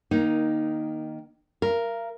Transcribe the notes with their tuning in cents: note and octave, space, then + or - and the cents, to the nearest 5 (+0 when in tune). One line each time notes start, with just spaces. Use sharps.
D#3 +0 A#3 +15 D#4 +0
A#4 +0 F5 -40